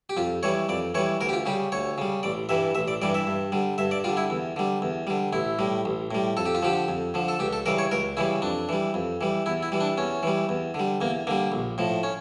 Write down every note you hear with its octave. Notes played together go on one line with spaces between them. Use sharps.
G4
F2 F4
E3 G3 C#5
F2 D5
E3 G3 C#5
D2 A#4
G4
F4
C#3 G3 G4
D2 C#5
C#3 G3
A1 D5
G2 E3 G3 E5
A1 E5
D5
G2 E3 G3 D5
E5
G2
D3 G3
G2 E5
D5
D3 G3 F4
E4
E2
D3 G3
E2
D3 G3
A1 E4
A2 G3
A1
A2 G3
F2 A4
G4
F4
D3 F3 G4
F2
D3 F3
A4
C#2 G4
A4
C#3 E3 G3 A#4
C#5
C#2 A#4
C#3 E3 G3 E4
F2 D4
E3 G3
F2
E3 G3
E2 E4
E4
E3 G3
D4
E2 C#4
E3 G3
E2
D3 G3
E2 A#3
D3 G3 A#3
A#1
A2 F3
C#4